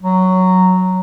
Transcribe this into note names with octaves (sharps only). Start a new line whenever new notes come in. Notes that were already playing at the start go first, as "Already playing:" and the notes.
F#3